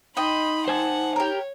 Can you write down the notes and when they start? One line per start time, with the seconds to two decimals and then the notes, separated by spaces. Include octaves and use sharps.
0.17 D#4 D#5 G5 B5 C6
0.68 C5 F#5 G#5 A5
1.16 G4 A#4 C#5